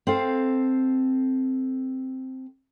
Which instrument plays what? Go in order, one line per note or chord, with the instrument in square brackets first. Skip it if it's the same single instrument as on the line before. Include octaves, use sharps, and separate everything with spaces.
[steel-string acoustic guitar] C4 A4 F5